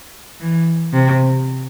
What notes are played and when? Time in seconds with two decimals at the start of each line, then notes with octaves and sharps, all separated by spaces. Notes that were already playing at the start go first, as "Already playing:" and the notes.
0.40 E3
0.93 C3